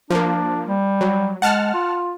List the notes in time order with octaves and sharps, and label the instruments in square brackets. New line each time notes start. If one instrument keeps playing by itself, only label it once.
[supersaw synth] F3 A#3 [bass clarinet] D4
[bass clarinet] G3
[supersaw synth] F#3
[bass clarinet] G#3 [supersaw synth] F#5 A5 F6
[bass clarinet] F4